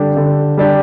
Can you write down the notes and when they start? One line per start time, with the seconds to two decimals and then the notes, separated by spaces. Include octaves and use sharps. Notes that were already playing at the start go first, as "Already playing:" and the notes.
Already playing: D3 G3 D4 G4
0.16 D3
0.58 G3 D4 G4